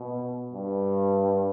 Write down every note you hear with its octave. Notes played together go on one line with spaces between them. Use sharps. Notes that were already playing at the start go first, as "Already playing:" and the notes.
Already playing: B2
G2